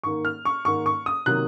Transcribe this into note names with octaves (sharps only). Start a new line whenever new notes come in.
G#2 D#3 A#3 C#6
F6
C#6
G#2 D#3 A#3 C#6
C#6
D#6
C3 D#3 F#3 A#3 F#6